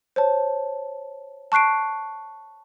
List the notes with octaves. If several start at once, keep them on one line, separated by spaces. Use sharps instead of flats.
C5 C#5 A5
A5 C#6 F#6 C7 D7